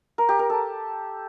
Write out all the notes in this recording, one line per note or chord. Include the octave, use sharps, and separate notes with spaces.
A#4
G4
A#4
A4